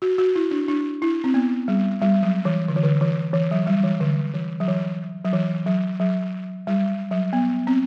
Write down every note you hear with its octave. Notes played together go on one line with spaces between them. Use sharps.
F#4
F#4
E4
D4
D4
E4
C4
B3
G3
G3
F#3
E3
D3
E3
D3
E3
E3
F#3
G3
E3
D3
E3
F#3
E3
F#3
E3
F#3
F#3
G3
F#3
B3
C4